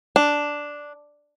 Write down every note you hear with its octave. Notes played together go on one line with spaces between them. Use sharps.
D4